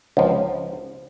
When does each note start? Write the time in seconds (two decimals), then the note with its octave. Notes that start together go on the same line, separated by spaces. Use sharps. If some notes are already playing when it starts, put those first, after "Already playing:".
0.17 C#2 F3